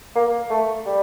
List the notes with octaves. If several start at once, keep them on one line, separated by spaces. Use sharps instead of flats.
A#3
A3
G3